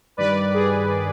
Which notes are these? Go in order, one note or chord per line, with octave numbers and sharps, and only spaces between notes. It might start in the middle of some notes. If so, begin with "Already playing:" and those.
G2 D#3 G3 B4 D5
G#4